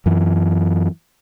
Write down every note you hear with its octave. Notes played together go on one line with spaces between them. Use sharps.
F#2 E3